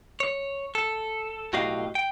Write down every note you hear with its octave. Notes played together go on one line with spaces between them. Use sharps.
C#5
A4
B1 A2 F#4 G4 D#5 F5
G5